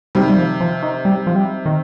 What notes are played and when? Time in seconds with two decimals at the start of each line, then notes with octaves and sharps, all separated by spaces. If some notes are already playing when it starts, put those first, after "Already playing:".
0.15 C3 D#3 G3
0.29 G3
0.38 F3
0.60 F3
0.82 D#3
1.05 G3
1.27 F3
1.35 G3
1.66 D#3